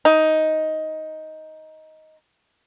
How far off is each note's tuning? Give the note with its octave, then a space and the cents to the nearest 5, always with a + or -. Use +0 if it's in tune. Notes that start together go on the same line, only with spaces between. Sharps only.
D#4 +10